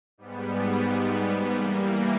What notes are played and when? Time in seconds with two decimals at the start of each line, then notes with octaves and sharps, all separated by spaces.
0.18 G#2 G3 B3
1.54 E3 G3 A#3